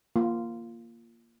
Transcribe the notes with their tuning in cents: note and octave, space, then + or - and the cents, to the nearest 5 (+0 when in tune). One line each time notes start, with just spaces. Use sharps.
A#3 +0 F4 -15